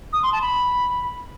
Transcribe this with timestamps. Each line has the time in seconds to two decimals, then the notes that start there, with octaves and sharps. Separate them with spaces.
0.13 D#6
0.23 C6
0.32 A5
0.42 B5